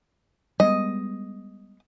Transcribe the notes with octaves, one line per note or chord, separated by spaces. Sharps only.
G3 G#3 B3 D#5